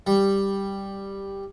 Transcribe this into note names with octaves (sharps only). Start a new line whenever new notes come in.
G3